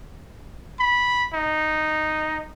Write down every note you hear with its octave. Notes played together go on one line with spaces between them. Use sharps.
B5
D#4